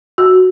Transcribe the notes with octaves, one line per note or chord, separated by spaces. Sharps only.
F#4